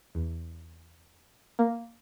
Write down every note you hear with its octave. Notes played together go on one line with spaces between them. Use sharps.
E2
A#3